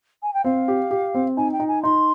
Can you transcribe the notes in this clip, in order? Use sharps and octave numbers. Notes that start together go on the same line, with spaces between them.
G#5
G5
C4 F5
G4
G4
C4
D#4 G#5
G5
D#4
G#5
D#4 C6